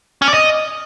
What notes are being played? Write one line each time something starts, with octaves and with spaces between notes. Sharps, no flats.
C#4
D5
D#5